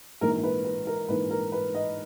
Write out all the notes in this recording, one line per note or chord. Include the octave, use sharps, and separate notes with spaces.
A#1 G#2 E3 A#4
B4
B4
A#4
A#1 G#2 E3 B4
A#4
B4
D#5